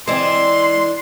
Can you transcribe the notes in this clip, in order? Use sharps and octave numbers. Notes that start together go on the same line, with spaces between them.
E3 G#3 C4 D4 C6